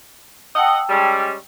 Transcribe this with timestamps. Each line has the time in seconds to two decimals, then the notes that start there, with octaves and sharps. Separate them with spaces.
0.56 D#5 F#5 G5 A5 E6
0.89 G3 G#3 C#4